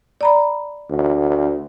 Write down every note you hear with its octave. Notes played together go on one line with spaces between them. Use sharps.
D5 A#5 B5
D2